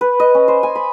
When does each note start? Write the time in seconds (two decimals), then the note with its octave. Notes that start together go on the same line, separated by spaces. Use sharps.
0.01 B4
0.20 D#5
0.35 C#4
0.48 C5
0.63 G#5
0.75 B5